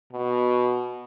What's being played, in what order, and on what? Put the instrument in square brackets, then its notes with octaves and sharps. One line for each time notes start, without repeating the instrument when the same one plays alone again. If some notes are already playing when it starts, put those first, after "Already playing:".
[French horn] B2